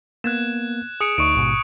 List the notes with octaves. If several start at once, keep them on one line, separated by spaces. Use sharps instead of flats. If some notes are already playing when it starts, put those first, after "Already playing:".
A#3 B3 F#6 G#6 E7
G#4 D#6 C#7 D7
D2 D#4 C#6 D7
A1 G#2 B2